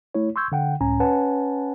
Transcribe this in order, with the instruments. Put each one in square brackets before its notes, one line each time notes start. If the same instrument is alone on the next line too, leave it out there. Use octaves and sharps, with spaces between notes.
[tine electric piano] A3 E4 C#5
C6 C#6 E6 G6 G#6
D3 F#5 G5
C#2 A2 C#4 G#5 A#5
C#4 B4 C#5 F#5 G#5 A5